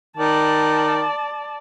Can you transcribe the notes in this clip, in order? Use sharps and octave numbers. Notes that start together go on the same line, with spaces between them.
D#3 D5 A5